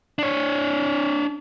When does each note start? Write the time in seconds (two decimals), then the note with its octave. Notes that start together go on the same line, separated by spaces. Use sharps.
0.19 D4 C#5